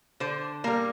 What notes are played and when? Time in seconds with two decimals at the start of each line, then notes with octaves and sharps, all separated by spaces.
0.20 D3 C5
0.64 G3 A#3 A#4